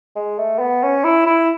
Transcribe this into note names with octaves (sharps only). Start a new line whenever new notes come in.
G#3
A3
B3
C#4
E4
E4